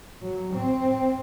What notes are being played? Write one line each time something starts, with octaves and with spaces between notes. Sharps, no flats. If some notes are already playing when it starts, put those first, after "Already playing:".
F#3
C4